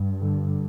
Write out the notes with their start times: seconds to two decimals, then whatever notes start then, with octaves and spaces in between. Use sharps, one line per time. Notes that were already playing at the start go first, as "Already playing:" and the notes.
Already playing: G2
0.20 D3